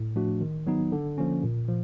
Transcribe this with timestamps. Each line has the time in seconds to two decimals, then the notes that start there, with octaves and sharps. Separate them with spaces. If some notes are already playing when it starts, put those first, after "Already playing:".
Already playing: A2
0.16 F3 A3 D4 F#4
0.41 D#3
0.67 F#3 B3 D#4
0.92 D3
1.18 F3 A#3 C#4
1.43 A#2
1.69 F3